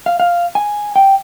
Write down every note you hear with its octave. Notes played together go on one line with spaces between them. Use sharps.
F5
F5
G#5
G5